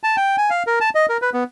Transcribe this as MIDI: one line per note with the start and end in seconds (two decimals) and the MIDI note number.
0.03 0.16 81
0.17 0.36 79
0.38 0.50 80
0.50 0.63 77
0.67 0.79 70
0.81 0.90 81
0.95 1.06 75
1.09 1.17 70
1.22 1.30 71
1.34 1.44 59